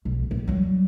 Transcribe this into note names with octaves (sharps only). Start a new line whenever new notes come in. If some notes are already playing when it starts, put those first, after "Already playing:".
B1
A#1
F#3 G3